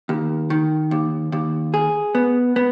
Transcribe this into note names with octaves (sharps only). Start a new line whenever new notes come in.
D#2
D#3
D#2
D#2
G#4
B3
B3